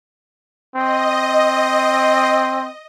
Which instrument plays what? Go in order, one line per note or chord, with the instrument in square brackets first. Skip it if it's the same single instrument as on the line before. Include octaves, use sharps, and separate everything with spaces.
[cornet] C4 [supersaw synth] D#5